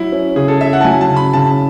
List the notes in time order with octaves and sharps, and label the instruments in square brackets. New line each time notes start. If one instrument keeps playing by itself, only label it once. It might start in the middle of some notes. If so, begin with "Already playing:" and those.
Already playing: [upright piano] F#3 [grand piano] E4
[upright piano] C#4
[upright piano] C#3 [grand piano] G#4
[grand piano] A4
[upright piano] E4 [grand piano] E5
[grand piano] F#5
A5
[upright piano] F#3 [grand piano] G#5
[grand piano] A5
[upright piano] C#3
[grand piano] B5
[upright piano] C#3 [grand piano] A5